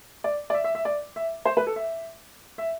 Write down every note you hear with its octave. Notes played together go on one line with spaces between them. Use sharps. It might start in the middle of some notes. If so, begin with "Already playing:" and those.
D5
D5
E5
E5
E5
D5
E5
C5
B4
A4
E5
E5